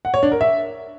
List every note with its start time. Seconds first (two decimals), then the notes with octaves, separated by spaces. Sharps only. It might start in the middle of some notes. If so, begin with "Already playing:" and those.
0.05 F#5
0.14 C#5
0.23 D4
0.32 A#4
0.41 E5